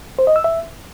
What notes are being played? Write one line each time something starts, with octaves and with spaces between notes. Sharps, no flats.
C5
D#5
E6
E5